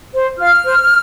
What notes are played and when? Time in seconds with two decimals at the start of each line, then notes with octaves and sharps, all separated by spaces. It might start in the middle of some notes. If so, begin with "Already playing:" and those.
0.14 C5
0.39 F4 F6
0.64 C5